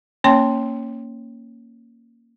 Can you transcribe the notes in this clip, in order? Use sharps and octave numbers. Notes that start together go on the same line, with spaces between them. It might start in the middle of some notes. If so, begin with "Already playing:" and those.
A#3 C#4 C#5 G5 C6